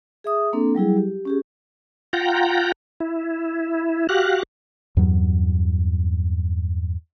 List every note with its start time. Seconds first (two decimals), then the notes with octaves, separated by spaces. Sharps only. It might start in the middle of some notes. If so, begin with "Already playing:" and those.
0.24 G#4 E5 D#6
0.53 A#3 C4 D4 A4
0.75 F#3 G3 E4 G#4
0.97 G4
1.25 C#4 G4 G#4
2.13 F4 F#5 G5 A#5
3.00 E4
4.09 F#4 G4 F5 F#6
4.97 E2 G2 F#3